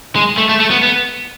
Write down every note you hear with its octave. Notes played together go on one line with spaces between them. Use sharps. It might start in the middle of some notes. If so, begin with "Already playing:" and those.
G#3
A3
A3
A3
B3
B3